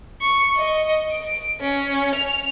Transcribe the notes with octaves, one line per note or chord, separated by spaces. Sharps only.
C#6
D#5
D7
C#4
F7